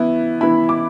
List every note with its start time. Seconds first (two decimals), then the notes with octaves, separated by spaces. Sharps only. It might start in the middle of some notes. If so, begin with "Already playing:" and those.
Already playing: E3 B3 E4
0.41 E3 B3 E4 B5
0.69 D6